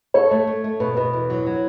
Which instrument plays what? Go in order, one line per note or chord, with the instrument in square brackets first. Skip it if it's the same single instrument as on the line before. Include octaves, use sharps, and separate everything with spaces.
[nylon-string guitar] A4 [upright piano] C#5
[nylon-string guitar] A3
A3
A3
[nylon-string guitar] B2 [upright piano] B4
[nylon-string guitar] B2 [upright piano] B4
[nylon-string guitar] E2
F#3
F#3